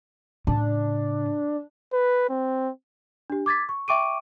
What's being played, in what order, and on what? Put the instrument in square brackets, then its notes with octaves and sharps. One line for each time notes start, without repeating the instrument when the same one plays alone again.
[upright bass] A2 C#3 [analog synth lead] D4
[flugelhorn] B4
C4
[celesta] D4 G4
D6 G#6 A6 B6
C#6
E5 G5 C#6 D6 D7 D#7